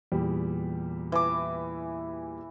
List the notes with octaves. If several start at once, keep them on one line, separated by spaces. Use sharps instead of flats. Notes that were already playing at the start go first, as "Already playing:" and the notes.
E2 A#2 G3
E3 D6